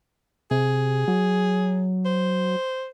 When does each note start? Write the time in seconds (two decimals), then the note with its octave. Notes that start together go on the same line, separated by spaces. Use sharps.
0.51 C3 G#4
1.08 F#3
2.06 C5